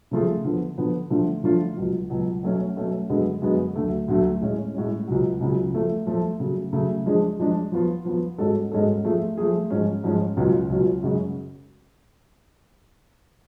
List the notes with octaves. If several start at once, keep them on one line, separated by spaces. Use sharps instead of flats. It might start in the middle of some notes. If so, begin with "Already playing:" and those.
C#3 F3 A3 F4 G#4
D3 F3 B3
D3 F3 B3
D3 F3 A3 D4 F4
D3 F3 A3 D4 F4
C#2 B2 F#3
C#2 B2 F#3
B2 F#3 A3 C#4
B2 F#3 A3 C#4
F#2 D3 G#3 B3
F#2 D3 G#3 B3
D2 D3 F#3 A3
D2 D3 F#3 A3
A2 G#3 C#4
A2 G#3 C#4
C#2 C#3 F#3
C#2 C#3 F#3
F3 A3 F4 A4
F3 A3 F4 A4
C#3 F#3 A3
C#3 F#3 A3
F3 G#3 D4 G#4
F3 G#3 D4 G#4
F3 B3 F4
F3 B3 F4
G#2 G#3 C#4 F#4 A4
G#2 G#3 C#4 F#4 A4
F3 A3 F4 G#4
F3 A3 F4 G#4
G#2 F3 G#3 C#4
G#2 F3 G#3 C#4
C#2 B2 F#3 C#4 F4
C#2 B2 F#3 C#4 F4
F#2 C#3 G#3 C#4 F#4